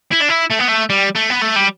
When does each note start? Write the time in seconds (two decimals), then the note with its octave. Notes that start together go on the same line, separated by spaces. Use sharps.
0.13 E4
0.22 D4
0.30 E4
0.51 A3
0.60 B3
0.69 A3
0.90 G3
1.15 A3
1.30 B3
1.41 A3
1.56 G3